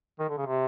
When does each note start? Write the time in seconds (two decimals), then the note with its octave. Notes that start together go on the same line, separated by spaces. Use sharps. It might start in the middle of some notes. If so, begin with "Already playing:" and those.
0.20 D#3
0.30 D3
0.38 C#3
0.46 C3